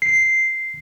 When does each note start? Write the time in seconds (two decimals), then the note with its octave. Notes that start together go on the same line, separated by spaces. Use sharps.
0.02 C7